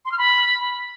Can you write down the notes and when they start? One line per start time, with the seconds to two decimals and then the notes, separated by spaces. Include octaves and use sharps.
0.05 C6
0.12 F6
0.18 B5